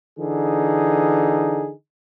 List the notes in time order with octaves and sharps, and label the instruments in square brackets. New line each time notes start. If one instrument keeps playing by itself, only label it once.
[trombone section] D3 E3 D#4 G#4